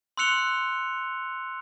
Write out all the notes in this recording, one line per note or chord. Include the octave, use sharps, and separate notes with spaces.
C6 E6 F#6 C#7 F7 G7